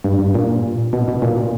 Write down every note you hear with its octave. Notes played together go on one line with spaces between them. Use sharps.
G2
G2
A#2
B2
B2
A#2